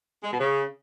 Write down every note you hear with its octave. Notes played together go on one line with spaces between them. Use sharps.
G#3
B2
C#3